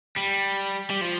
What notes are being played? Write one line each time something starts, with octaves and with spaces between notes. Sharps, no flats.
G3
G3
F3